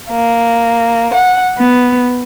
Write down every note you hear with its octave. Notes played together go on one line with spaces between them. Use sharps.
A#3
F#5
B3